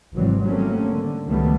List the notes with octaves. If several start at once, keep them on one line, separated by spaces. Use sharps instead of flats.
G#1 C3 E3 F#3 G3 C4
F#3 G3 A3 A#3 C4 C#4
D3
C#2 D#3 F#3 G3 A3 B3